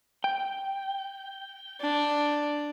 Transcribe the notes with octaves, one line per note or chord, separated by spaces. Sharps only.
G5
D4